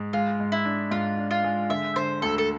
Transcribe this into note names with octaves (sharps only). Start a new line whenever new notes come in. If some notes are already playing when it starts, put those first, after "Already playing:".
Already playing: G#2
G#3 F4
G#2
E4
D4
G#2 F4
D4
F4
G#3
D3 E5
D3 C5
D2 A4
A4